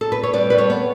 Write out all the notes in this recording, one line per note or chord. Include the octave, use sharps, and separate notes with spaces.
A4
B4
C#5
G3 B4 D5
G3 B4
A4 C#5
B3